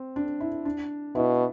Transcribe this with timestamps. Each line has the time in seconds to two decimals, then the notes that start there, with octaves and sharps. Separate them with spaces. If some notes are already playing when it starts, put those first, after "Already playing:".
Already playing: C4
0.16 D4
0.40 E4
0.65 D4
1.15 B2 E4